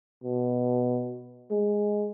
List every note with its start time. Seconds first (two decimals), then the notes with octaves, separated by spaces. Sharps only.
0.24 B2
1.51 G#3